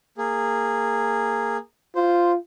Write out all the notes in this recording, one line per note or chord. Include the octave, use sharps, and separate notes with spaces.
A#3 G#4
F4 C5